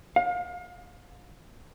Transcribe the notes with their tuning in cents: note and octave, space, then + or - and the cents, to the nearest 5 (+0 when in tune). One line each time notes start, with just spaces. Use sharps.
F5 +35